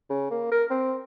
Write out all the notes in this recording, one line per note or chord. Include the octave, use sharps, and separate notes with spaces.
C#3
A#3
A#4
C4